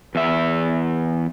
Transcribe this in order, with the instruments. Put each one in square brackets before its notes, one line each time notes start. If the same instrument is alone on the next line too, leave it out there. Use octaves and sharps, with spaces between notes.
[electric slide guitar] E2 E5